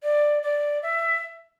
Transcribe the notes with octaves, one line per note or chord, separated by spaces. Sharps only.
D5
D5
E5